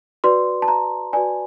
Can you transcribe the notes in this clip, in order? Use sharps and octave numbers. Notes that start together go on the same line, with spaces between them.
F#4 B4 D5 C6
A5
A#5
F#4 B4 D5 G#5